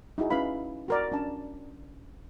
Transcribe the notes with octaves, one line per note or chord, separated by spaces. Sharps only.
D#4 E4 F#4 G#4
C#4 E4 B4 F5 B5
F#4 A#4 D5
C#4 D4 A5